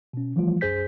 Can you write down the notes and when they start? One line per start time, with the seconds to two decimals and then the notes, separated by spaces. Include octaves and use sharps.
0.13 B2 C#4
0.36 E3 F3 G3 A3 F4
0.61 B1 F#2 G#4 C5 G6 B6